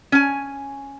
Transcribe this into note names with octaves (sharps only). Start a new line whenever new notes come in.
C#4 G#5